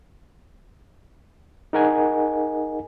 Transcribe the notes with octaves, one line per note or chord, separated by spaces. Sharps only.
D#4 G#4 A#4 D#5 F#5 G#5